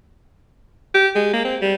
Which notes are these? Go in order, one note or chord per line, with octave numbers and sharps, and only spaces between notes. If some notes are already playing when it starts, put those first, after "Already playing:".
G4
G#3
A#3
C4
G3